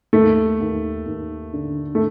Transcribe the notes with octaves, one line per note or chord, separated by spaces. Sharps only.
D#2 A3
D#2
D#2
D3
A3